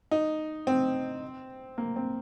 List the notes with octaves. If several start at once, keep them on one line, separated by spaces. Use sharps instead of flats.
D#4
C4
A#3
C4